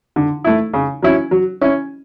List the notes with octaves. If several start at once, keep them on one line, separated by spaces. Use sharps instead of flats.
D3
A3 E4
C#3
F#3 C#4 E4
F#3
C#4 E4